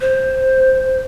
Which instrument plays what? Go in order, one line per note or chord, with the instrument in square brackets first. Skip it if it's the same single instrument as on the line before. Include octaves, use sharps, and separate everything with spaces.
[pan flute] C5